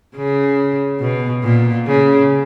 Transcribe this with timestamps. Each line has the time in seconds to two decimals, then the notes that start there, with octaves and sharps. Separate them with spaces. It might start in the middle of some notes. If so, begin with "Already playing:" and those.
0.16 C#3
1.00 B2
1.44 A#2
1.87 C#3